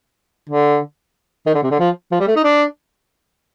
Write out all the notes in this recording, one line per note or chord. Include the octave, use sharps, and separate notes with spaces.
D3
D#3
D3
C3
D3
F3
F3
G3
A3
D#4
D4